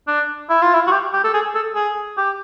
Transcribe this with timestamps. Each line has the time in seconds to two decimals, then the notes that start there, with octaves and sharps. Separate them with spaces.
0.08 D4
0.49 E4
0.61 F4
0.74 E4
0.87 F#4
0.91 G4
1.13 G4
1.24 A4
1.33 G#4
1.55 A4
1.75 G#4
2.17 G4